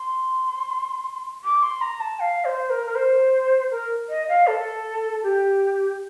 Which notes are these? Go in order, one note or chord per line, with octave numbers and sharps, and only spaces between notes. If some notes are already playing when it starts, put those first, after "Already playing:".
Already playing: C6
D6
C6
A#5
A5
F5
C5
A#4
A#4
C5
A#4
D#5
F5
A4
G4